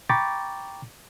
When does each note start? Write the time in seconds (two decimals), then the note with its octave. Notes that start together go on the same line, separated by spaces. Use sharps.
0.09 G5 A#5 B5 C#6 D6 A6